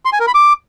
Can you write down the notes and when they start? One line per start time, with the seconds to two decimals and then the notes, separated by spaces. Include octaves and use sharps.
0.05 C6
0.13 G#5
0.20 A#4
0.27 B5
0.35 D6